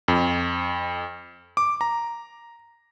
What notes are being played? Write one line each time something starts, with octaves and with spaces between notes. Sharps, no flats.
F2
D6
A#5